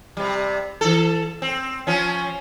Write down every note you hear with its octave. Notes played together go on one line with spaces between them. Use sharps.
C3 G3
E3 A4
C4
F3 C#4